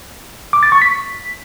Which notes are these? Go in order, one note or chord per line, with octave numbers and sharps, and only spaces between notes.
D6
A6
C#6
B6